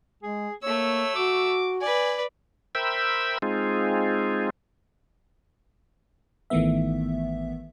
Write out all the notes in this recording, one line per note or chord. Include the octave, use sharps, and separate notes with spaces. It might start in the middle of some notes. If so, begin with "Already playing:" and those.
G#3 G#4
A3 A#3 C#5 E6
F#4 D6
B4 D5 G#5
A#4 C5 E5 G5 B5 E6
G#3 C4 D#4 F4 G#4
G#1 D#3 E3 A3 B3 E5